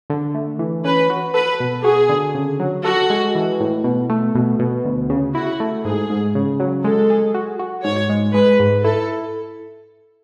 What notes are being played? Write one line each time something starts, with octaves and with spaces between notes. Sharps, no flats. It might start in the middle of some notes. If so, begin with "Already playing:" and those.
D3
A3
E3
C#4 B4
F#4
A4 B4
B2
F#4 G#4
D3
C#3
F#3
F#4 A4
G#3
E3
A2
B2
A3
B2
B2
D2
C#3
E4 F#4
A3
G#2 G#4
G#2
C#3
F#3
G#3 A4
G#4
F#4
F#4
G#2 C#5
G#3
G#3 B4
G#2
E4 A4